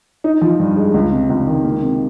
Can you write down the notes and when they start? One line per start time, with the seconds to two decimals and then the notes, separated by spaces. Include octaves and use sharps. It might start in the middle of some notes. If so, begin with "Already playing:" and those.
0.24 D#4
0.41 F3
0.60 G2
0.77 G#3
0.94 C#2
1.12 C3
1.29 C#2
1.47 D#3
1.65 A#3
1.82 C3